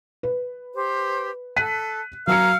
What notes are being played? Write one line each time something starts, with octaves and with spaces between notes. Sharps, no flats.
B4
G4 C5
A4 F#6 B6 D#7
F#3 C#4 A#4 F5 A#5 E6 C#7